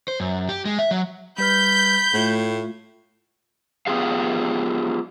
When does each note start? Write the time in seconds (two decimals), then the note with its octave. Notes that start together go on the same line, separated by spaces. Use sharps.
0.08 C5
0.20 F#2
0.49 G4
0.65 G#3
0.79 E5
0.91 F#3
1.38 G3 B4 B5 F6 G6
2.14 A2 A3 F4
3.87 B3 F4 G4 G#4 F5